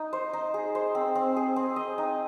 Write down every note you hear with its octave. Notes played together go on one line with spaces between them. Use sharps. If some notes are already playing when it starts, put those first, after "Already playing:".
Already playing: D#4
C5
D#4
G#4
C5
C4
C4
G#4
C4
D#5
D#4